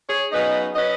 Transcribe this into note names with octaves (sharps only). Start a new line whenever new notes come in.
G#4 C#5
C#3 F#3 B3 D#4 B4 D#5
F#3 C#4 B4 D#5